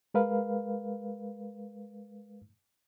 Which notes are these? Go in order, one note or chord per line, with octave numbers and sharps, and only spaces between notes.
G#3 A#4 B4 F5